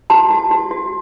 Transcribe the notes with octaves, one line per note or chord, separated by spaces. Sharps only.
F#4 A5
F#4
F#4
F#4